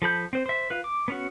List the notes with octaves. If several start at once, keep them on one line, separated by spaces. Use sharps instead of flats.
F3 A4 B5 G6
C4 C5
C5 E5
F4 B4
D6
B3 C#4 F#4